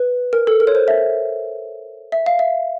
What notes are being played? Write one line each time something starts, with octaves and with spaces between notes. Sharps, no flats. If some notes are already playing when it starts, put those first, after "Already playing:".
Already playing: B4
A#4
A4
A#4
C#5
C5
E5
E5
F5
E5